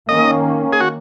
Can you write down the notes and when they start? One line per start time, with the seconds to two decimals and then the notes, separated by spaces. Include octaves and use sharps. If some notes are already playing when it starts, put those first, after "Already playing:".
0.09 D#3 A#3 C#4 D#5
0.73 G#4
0.80 F#4